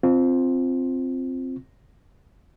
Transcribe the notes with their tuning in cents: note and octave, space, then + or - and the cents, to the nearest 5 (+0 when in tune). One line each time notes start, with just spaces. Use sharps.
C4 +0 F4 +0